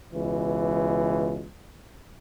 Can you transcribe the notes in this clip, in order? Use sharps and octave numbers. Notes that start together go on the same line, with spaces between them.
C#2 B2 E3